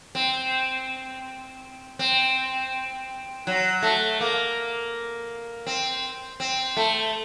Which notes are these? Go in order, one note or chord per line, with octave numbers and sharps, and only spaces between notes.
C4
C4
F#3
A3
A#3
C4
C4
A3